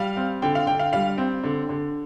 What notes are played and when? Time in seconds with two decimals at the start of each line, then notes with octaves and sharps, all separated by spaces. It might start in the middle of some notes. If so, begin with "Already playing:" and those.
Already playing: G3 F5
0.17 C4
0.42 D3 G5
0.55 F5
0.67 D3 G5
0.79 F5
0.93 G3 F5
1.18 C4
1.44 D3
1.69 D3